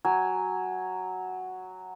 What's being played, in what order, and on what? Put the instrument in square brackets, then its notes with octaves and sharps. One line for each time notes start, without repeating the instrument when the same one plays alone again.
[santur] F#3 G#5